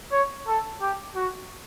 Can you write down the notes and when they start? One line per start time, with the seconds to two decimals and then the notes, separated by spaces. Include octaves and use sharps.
0.12 C#5
0.47 A4
0.81 G4
1.16 F#4